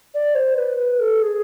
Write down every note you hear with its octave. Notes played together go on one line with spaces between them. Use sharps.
D5
C5
B4
B4
A4
G#4